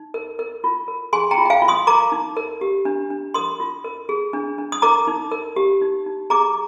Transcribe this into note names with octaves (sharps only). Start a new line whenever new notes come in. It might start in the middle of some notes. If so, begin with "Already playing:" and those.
Already playing: D#4
A#4
A#4
F4
A#4
G#4 G#5 C6
G5 A#5
F4
G5
F5 G#5
F4
C6 D#6
A#4 A#5 D6
D#4
A#4
G4
D4
D4
A#4 C6 D#6
F4
A#4
G#4
D4
D4
D#6
A#4 A#5 D6
D#4
A#4
G4
D#4
D#4
G#4 A#5 D6